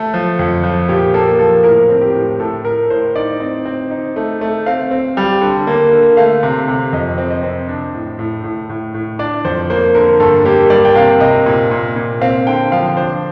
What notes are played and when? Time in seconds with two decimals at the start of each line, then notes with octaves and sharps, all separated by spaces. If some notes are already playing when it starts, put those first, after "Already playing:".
Already playing: A3 A4
0.14 F3
0.39 F2
0.64 F3
0.89 A#2 G4
1.14 A#3 A4
1.39 F3 A4
1.64 A2 A#4
1.89 C4
2.01 G4
2.15 A2
2.40 A2 A4
2.65 A2 A#4
2.90 A2 C5
3.15 D#4 D5
3.40 C4
3.65 C4
3.91 D#4
4.16 A3
4.41 A3
4.66 C4 F5
4.91 C4
5.17 G3
5.41 D3
5.67 A#3
5.92 D3
6.17 A3 F5
6.43 C3
6.68 C3
6.93 F2 D#5
7.18 C4
7.30 D#5
7.43 C4
7.69 D4
7.94 A2
8.19 A2
8.44 A2
8.69 A2
8.94 A2
9.19 D4 D5
9.45 F2 C5
9.70 A#3 C5
9.95 D3 A#4
10.20 G2 A4
10.45 A#3 G4
10.70 G3 D5
10.85 G5
10.96 C3 F5
11.20 C3 D#5
11.46 A#2
11.71 A#2
11.96 A#2
12.21 C4 F5
12.47 D3 G5
12.72 F3 F5
12.97 D4 C5